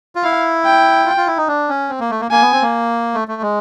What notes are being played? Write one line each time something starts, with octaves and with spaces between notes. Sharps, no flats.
F4
E4 F5
G5
F4
F4
E4
D#4
D4
C#4
C4
A#3
A3
A#3
A#3 G#5
B3
C4
A#3
A3
A3
G#3